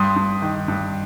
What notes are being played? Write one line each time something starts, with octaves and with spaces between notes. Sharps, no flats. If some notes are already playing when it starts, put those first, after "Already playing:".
Already playing: G2 C6 D#6
G2
D#3
G2